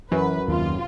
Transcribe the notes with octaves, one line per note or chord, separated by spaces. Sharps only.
F#2 E3 B4
D#2 C3 F4